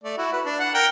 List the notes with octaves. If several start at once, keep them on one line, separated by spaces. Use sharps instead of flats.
A3 D5
E4 F#4
B4
D4
F#5
A#4 G5